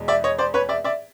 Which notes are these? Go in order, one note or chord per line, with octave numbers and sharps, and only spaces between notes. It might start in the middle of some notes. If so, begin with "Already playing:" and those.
Already playing: E2 B2 G#3
D5 E5
C#5 D#5
C5 D5
B4 C#5
D5 E5
D5 E5